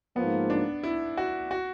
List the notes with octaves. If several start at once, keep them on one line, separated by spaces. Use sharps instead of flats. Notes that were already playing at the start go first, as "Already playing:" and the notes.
G#2 F3 A#3 B3
D4
E4
F#4
F#4